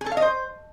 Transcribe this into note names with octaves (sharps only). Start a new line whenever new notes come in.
G#4
A4
F5
D#5
C5